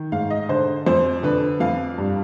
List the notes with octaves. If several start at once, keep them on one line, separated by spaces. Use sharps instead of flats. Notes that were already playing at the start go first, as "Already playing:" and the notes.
Already playing: D#3
G#2 F5
D#5
D3 C5
F2 C5
D3 B4
F2 F5
G2